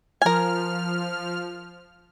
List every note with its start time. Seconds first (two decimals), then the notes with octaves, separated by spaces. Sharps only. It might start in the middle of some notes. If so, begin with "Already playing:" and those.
0.22 F3 A#4 G#5 F6